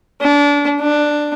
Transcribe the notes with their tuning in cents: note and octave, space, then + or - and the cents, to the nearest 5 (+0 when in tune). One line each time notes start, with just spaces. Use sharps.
D4 -30
D4 +10